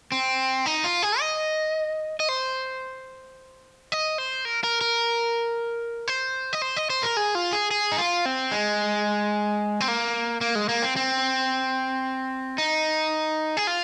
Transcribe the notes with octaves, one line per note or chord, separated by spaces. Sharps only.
C4
D#4
F4
G#4
D#5
D#5
C5
D#5
C5
A#4
A#4
A#4
C5
D#5
C5
D#5
C5
A#4
G#4
F4
G#4
G#4
D#4
F4
C4
G#3
C4
A#3
A#3
G#3
A#3
C4
C4
D#4
G#4
F4